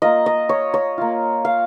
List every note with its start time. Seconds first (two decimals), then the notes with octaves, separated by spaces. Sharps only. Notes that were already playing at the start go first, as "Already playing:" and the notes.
0.02 A#3 F4 D#5
0.26 D#5
0.49 C#5
0.74 C#5
0.98 A#3 F4
1.45 F5